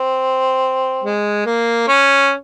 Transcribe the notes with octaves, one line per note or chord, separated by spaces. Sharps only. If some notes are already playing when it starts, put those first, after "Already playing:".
Already playing: C4
G#3
A#3
C#4